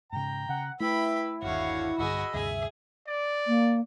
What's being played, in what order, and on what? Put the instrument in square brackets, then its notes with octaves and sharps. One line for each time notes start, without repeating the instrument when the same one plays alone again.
[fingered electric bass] G#2 C#3 [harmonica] G5 A#5
[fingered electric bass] C#3 [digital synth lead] F#5
[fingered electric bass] A3 [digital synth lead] E4 [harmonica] B4 E6 [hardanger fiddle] G5 B5
[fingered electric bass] G1 D#2 [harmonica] D3 C#5 F5 [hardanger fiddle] F#4
[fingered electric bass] B1 G2 D3 [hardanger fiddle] F#4 G#4 [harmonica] D#5 B5 E6
[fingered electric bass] D2 G2 C3 [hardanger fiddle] G#4 [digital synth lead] E5
[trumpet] D5
[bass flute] A#3